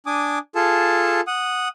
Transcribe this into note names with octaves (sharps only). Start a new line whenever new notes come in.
D4 G#5 D6 D#6
F4 G#4 A4 A5
F#5 D#6